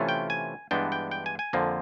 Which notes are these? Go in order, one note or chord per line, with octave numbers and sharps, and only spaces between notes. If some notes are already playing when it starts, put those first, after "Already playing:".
Already playing: C3 E3 A3 C#4 F4
G5
G#5
G2 E3 G#3 B3 D4 G5
G5
G5
G#5
G#5
F2 D3 F3 A#3